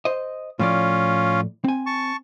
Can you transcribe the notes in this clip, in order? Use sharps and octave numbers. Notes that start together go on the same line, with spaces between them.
C5 D#5
A2 F3 C#4 F4 D5
C4 G#5
A5 C#6